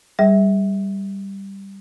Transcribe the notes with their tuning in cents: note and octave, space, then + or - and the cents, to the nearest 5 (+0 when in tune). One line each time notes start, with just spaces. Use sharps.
G3 +0 G#4 +0 E5 -20